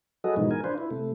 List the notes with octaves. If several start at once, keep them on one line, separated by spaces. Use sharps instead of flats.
F#3 F#4 G#4 A4 B4 D#5
G#2 B2 E3 F3 G#3 D#4
A#4 G#5
D4 F4 B4 C5
E4
C3 A3